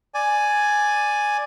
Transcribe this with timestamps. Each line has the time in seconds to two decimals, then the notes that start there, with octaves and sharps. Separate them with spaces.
0.14 D5 G#5